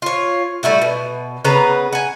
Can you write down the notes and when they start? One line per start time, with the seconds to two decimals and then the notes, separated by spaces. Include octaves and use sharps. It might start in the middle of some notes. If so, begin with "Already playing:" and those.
0.02 F4 C#5
0.63 G3 A3 E4 F#4
0.82 B2
1.45 C#3 B3 B4 A#5
1.93 F#5 G#5